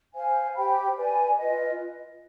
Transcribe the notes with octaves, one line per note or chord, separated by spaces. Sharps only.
C5 F5 G#5
G4 C5 G5 B5
B4 D5 G#5
F4 B4 D#5